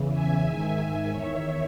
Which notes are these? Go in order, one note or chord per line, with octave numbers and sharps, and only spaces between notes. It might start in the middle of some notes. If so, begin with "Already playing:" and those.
Already playing: E2 C#3 E3
E5 G#5
G#2 D#3
E2 D#3 C#5 E5